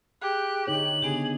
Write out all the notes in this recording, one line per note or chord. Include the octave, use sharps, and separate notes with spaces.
G4 G#4 F#6
D3 D#4 C#5 F#7
C#3 B3 D4 G4 G#4